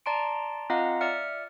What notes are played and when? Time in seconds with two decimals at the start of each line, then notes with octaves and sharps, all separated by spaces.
0.06 D5 A5 A#5 C6 D7
0.70 C4 F4 D#5 F5 F#5 A#5
1.01 D5 E5 F6 C#7